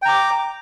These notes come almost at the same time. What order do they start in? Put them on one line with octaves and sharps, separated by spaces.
G5 A#5 D6